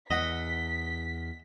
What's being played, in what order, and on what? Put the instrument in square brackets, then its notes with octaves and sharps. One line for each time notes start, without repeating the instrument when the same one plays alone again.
[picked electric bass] E2 [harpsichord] D#5 F#5 [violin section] B6